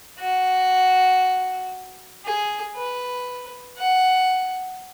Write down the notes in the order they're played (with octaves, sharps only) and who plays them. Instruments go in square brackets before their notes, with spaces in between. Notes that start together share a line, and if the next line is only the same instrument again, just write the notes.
[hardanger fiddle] F#4
G#4
B4
F#5